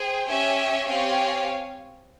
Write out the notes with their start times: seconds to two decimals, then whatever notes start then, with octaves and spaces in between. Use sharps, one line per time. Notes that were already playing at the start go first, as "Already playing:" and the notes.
Already playing: G#4 C5 G5
0.28 C#4 G4 C#5 E5 G#5
0.88 C4 G4 C#5 F5 G#5